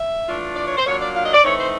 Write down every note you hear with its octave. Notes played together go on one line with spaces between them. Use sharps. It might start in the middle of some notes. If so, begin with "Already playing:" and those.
Already playing: E5
E3 A3 D4 F4
D5
C#5
C5
F#3 A#3 D4 F4 C#5
D5
F5
D#5
D5
E3 A3 C4 D#4 C#5
C5